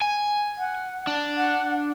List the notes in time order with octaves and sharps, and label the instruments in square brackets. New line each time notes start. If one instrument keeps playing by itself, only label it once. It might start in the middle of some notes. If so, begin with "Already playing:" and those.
[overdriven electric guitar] G#5
[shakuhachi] F#5
[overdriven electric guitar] D4
[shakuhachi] F#5